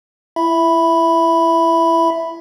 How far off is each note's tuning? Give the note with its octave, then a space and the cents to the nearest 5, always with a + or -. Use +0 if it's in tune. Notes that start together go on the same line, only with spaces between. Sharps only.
E4 +25 E5 +0 B5 +0